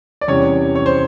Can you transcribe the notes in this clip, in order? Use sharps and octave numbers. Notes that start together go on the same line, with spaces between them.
D5
E2 C3 E3 G3 C#4 C#5
C#5
C5